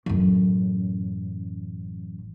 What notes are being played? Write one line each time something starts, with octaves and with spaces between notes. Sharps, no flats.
A1 F#2